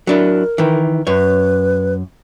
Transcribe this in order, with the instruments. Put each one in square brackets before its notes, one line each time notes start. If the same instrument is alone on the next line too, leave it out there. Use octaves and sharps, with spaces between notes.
[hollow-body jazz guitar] F#3 D4 E4 [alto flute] A#4
[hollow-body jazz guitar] D#3 E3
[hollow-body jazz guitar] F#2 C#5 [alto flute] B4